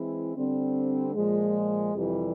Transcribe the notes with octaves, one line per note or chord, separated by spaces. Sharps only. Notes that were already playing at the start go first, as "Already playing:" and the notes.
Already playing: E3 G#3 C4 E4
D3 G3 C4
A#2 F3 G#3
F2 C3 E3 G3